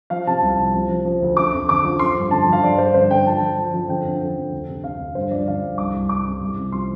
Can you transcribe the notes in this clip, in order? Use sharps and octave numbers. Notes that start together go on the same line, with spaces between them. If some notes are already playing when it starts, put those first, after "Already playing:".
F3 F5
C3 A5
C2
C3
F3
F3
F3
D2
D3 D6
F2
D3 D6
F3
F3 C6
G2
D3 A5
F3 F5
G2 D5
G2 C5
D3 C5
D3 G5
F3 A5
F3
F3
F3
D3 G5
F2
D3
F2
D2
C3
C3 F5
D2
G2 C5
F3 D5
D3 F5
G2
C2 D6
C2
C2 D6
C3
C2
C3
F3 C6